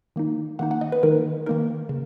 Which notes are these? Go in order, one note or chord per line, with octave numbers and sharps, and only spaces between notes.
D#3 A#3 D#4
D#3 A#3 D#4 F#5
F#5
D#5
B4
D#3 A#3 D#4 A#4
D#3 A#3 D#4 A#4
C#3